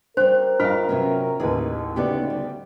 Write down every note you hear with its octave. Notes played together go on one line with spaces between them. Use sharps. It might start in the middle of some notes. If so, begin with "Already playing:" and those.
G3 G4 A#4 C5
G2 F4 D#5 F5 G5 F6
C3 F#3 B3 C#4
A1 D#2 G#4 B4
D2 C#3 B3 D#4 G4 D5
G3